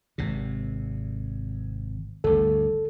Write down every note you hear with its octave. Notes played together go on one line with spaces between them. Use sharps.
G#1 C3
G1 D2 A4